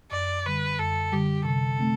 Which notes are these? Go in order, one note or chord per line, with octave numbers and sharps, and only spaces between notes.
F#2 D5
D3 G3 B4
F#2 A4
D3 G3 G4
C3 A4
A3 C4